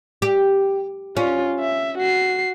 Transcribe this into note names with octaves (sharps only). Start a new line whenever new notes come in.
G4
C#4 F4
E5
F#4 C7